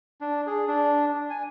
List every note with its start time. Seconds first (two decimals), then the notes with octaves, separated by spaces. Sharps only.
0.21 D4
0.47 G#4
0.68 D4
1.30 G#5